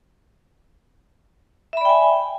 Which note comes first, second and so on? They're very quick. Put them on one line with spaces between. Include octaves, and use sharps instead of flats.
E5 B5 D5 G5 G#5